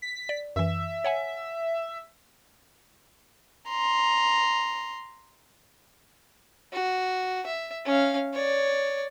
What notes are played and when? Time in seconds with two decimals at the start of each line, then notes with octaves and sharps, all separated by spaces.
0.02 B6
0.29 D5
0.56 F#2 E3 E5
1.04 C#5 F#5 G#5
3.68 A#5 C6
6.73 F#4
7.46 E5
7.85 C#4 F5
8.34 C#5 D5